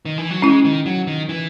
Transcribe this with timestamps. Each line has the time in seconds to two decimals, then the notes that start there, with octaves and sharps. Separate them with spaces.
0.05 D#3
0.18 E3
0.31 F#3
0.42 G#3 C#4 E4
0.65 D#3
0.86 F#3
1.07 D#3
1.29 E3